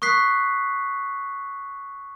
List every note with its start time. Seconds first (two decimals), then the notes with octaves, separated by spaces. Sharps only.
0.02 C#6 D#6 F#6 B6 C7